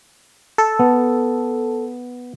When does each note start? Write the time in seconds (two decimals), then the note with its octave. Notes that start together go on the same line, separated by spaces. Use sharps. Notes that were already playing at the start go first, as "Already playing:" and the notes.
0.58 A4
0.79 B3